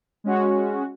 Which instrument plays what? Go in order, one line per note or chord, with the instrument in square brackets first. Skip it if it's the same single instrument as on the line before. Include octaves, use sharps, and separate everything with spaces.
[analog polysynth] G#3 C#4 F#4